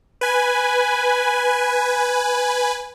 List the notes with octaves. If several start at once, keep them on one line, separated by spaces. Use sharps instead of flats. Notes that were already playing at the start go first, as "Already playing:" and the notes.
B4 G#5